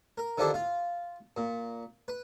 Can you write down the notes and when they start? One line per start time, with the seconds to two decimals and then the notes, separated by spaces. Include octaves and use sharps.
0.18 A#4
0.38 D3 D#3 F3 D4 E4 G4
0.54 F4 F5
1.37 A#2
2.08 B4